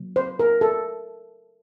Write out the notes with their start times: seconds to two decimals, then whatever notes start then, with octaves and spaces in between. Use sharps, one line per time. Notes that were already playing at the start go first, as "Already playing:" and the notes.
Already playing: C#3 F#3 A#3
0.16 C5
0.39 A#4
0.61 A4